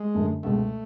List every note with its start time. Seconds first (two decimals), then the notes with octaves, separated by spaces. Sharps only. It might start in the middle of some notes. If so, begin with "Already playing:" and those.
Already playing: G#3
0.14 F#2 D3 A3
0.43 C#2 B2 G#3 A3